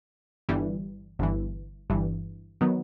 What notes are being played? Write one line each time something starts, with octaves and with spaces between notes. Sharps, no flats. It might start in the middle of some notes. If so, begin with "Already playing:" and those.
G1 G2 E3 G3
G1 G2 E3
G1 G2 E3
D#3 F#3 B3 D#4